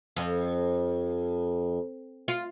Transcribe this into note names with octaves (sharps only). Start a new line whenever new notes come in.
F2
F4